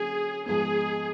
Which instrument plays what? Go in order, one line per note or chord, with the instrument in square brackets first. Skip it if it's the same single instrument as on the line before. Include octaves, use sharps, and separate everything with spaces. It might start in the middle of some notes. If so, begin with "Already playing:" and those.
Already playing: [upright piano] D3 F#3 A#3 C#4 [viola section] G#4
[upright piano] G#2 F3 G#3 B3 [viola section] G#4